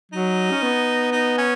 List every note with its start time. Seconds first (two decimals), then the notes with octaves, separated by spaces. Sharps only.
0.12 F#3 D#4
0.51 C#4
0.63 B3
1.12 D#4
1.38 C#4